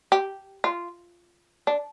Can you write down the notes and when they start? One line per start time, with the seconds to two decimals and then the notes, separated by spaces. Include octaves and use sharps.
0.12 G4
0.64 F4
1.67 D4